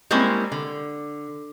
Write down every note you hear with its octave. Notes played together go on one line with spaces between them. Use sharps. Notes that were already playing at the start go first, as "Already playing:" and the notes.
G3 G#3 A#3 C4 C#4 E4
D3